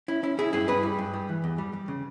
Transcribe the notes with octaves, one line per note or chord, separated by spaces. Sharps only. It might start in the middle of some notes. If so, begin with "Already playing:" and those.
C#4 E4
C#4 E4
C#4 E4 G#4
G2 E4 G#4
G2 G#4 B4
G3
G2
G3
E3
E2
G3
G3
C#3